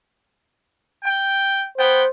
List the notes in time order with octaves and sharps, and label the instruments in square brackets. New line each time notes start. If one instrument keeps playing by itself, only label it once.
[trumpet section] G5
[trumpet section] B3 G5 [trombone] C5